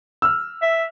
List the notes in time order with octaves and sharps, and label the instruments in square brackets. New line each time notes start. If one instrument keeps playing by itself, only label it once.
[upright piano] E6 F6
[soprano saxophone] E5